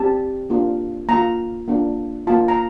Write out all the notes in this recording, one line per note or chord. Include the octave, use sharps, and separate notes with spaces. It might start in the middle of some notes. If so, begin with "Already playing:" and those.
Already playing: C4 G4 A5
A#3 D4 F4
A#3 F4 A#5
A#3 D4 F4
A#3 F4 A5
A#5